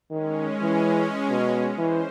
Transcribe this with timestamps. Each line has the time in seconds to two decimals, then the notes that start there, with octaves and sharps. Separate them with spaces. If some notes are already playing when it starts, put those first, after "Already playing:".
0.11 D#3 G#3 C#4
0.62 E3
1.30 B2
1.78 E3 C5